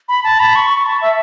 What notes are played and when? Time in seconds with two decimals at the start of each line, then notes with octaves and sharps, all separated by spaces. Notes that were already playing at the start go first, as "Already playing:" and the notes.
0.08 B5
0.24 A5
0.40 B5
0.56 C#6
0.70 C#6
0.86 A5
1.01 E5